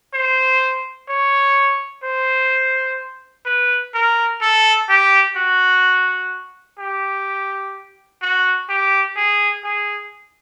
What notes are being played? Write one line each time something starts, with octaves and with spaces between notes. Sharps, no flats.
C5
C#5
C5
B4
A#4
A4
G4
F#4
G4
F#4
G4
G#4
G#4